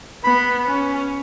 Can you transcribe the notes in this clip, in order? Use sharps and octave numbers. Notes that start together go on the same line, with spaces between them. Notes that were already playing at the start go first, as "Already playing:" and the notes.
B3 B5
C#4